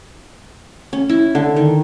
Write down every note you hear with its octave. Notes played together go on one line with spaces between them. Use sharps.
C#4
E4
D3
D#3